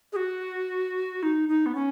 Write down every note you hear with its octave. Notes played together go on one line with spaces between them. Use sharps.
G#4
F#4
D#4
D#4
B3
C#4